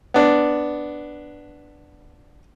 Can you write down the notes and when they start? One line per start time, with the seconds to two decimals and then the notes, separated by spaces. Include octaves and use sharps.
0.14 B3 D4